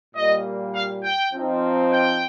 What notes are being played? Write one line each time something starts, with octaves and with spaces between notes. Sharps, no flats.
A#2 G3 A#3 D#5
F5
G5
F3 C4 D#4
G5